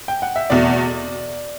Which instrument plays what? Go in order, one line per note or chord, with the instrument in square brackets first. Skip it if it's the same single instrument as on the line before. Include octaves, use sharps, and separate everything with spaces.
[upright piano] G5
F#5
E5
[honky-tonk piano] E2 B2 A3 [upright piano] D5